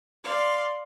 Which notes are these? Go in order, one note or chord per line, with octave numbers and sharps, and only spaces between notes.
D5 F5 C6